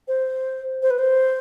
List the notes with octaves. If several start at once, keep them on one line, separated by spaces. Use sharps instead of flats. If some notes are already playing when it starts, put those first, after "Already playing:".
C5
C5
B4
C5